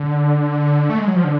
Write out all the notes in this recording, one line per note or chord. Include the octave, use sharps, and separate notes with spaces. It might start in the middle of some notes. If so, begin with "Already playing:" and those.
Already playing: D3
A3
G#3
F#3
F3
D3